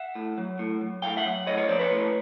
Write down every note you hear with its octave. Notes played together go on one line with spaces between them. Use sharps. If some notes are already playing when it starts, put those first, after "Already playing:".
Already playing: E5 F#5
A2
F#3
A2
F#3
A2 F5 G5
E5 F#5
F#3
A2 C#5 D#5
C#5 D#5
F3 C5 D5
B4 C#5
A2